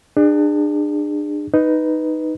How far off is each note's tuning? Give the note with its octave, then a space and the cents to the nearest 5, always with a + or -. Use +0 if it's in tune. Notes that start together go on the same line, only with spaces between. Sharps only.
D4 +30 G#4 -25
D#4 +0 B4 +0